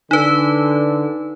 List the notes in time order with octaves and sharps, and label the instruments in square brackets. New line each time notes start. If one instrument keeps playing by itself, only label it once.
[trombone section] D3 [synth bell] D#4 B4